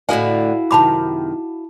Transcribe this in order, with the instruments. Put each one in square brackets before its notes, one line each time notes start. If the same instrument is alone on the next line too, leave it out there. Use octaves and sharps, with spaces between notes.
[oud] A2 D3 D#5 [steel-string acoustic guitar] E4 F#4 F5 [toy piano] A4 G#5
[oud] F#2 C3 D#3 [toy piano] A5 B5 D6